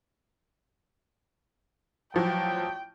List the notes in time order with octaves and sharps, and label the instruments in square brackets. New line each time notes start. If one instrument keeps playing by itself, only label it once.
[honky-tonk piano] A1 F3 F#3 [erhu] G5